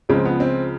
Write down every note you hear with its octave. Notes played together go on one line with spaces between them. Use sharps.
C#2 C#3 F3 G#3 C4
B3
C4